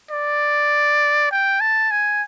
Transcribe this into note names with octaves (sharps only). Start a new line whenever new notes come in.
D5
G5
A5
G#5